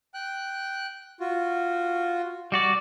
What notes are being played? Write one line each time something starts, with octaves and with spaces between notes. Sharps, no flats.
G5 F#6
F4 F#4
G3 F#4 D5